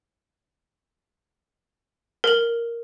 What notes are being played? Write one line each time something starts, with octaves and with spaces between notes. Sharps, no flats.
A#4 F#7